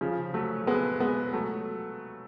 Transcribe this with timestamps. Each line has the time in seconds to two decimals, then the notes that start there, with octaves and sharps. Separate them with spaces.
0.01 C#3 F3
0.34 F#3 A3
0.67 G#3 B3
1.00 G#3 B3
1.33 F#3 A3